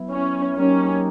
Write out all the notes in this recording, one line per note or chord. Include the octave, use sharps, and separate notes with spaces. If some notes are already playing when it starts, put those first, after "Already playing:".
Already playing: F#3 B3 E4
C#4
F#3 A#3 C#4 D#4 G4 A#4